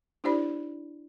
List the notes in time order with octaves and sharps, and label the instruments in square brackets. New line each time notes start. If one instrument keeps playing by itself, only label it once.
[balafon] D4 E4 G4 C5 D5 B5